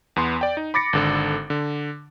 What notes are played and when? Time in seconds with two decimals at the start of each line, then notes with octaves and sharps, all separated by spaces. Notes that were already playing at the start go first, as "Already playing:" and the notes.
0.16 E2 B3 C6
0.41 D5 G5
0.57 D#4
0.74 B5 D6 A6 A#6 C#7
0.93 G#1 D3 A4
1.50 D3